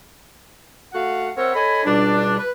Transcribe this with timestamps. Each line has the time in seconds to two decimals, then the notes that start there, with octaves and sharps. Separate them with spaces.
0.93 A3 F#4 F5 F#5
1.37 C4 A#4 C5 C#5 E5 F#5
1.55 A4 C#5 D#5 G#5 B5
1.85 C#2 B2 G3 D4
2.39 B4